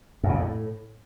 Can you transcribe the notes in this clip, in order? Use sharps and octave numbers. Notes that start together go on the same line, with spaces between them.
F#2
C#3
F2
A2